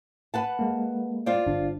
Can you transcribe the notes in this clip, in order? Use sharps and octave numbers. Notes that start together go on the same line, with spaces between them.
B4 F#5 A5
G#3 A#3
F4 C5 D5
G1 D4